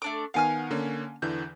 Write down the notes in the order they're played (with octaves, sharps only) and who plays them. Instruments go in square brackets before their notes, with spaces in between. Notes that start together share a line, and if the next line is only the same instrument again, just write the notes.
[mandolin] A3 D4 D6
[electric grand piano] D#3 B3 F#5 [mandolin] F5 G#5 F6
[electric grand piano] D3 A#3 C#4
[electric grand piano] E2 D3 E3 [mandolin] G6